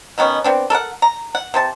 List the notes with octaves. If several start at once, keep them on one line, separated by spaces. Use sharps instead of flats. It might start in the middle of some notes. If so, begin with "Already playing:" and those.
B2 D#3 B3 C#4
B3 C4 D4
A4 A#4 D5 F#5
A#5
F#5
C3 C5 A5